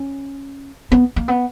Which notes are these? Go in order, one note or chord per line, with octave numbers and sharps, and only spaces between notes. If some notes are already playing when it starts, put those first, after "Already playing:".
Already playing: C#4
B3
A#3
B3